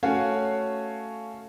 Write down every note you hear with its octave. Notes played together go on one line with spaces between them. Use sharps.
A3 C#4 F#4 C#5 F5